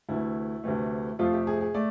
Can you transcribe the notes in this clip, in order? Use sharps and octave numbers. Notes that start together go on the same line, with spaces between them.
D2 C3 E3 A3 E4
D2 C3 E3 A3
F2 C3 F3 A3 F4
G4
G#4
G#4
A3 D5